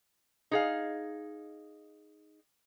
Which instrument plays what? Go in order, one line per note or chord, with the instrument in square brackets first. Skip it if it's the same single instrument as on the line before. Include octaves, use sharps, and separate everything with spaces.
[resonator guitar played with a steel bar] D#4 G#4 F5